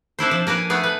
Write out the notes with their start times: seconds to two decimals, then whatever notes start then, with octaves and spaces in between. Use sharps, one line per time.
0.19 C4 D4 E4 C5
0.31 F3
0.47 A#3 A#4 B4 G#5
0.70 A3 B3 G#4
0.84 B4